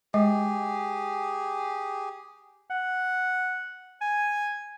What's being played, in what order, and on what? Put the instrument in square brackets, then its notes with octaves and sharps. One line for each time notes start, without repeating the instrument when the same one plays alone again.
[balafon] G#3 [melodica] G4 G#4
[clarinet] F#5
G#5